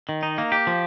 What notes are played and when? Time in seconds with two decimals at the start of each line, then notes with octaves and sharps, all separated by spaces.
0.09 D#3
0.23 D#4
0.38 A#3
0.52 G4
0.67 F3